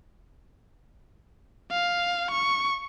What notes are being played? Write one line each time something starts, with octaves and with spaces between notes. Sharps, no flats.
F5
C#6